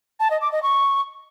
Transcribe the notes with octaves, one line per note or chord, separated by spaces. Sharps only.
A5
D#5
D6
D#5
C#6